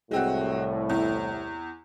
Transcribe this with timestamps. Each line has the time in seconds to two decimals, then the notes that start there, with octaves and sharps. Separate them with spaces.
0.11 C2 A2 G#3 C4 F#4
0.89 E2